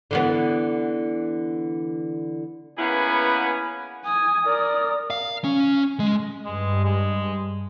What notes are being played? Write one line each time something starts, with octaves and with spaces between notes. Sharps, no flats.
D3 E3 B3
A#3 B3 C#4 E4 G#4 B4
G#5 D#6
A#4 D5
F5
C#4
G#3
G2 G#3
G#3